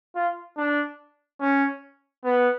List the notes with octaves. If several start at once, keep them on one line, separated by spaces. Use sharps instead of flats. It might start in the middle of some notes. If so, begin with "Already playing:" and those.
F4
D4
C#4
B3